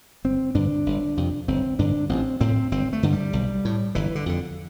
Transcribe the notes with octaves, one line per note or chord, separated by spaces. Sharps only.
G1 C4
G2 D3 D4
G1
F2 C3
G1 C4
G2 D3 D4
A1 C4
A2 C4
G1 C4
A3
G2 D3
G3
B1
A2
G1 E3
D3
F2 D3